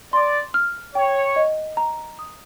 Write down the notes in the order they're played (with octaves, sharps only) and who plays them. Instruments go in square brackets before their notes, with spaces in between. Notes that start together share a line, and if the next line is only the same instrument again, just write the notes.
[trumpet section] D5 [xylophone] C6
[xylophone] F6
[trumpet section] C#5 [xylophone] G5
[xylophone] D#5
A#5
D#6